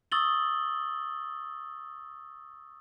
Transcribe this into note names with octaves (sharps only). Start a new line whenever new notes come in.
C#6 D#6 E6 A6 F#7 G7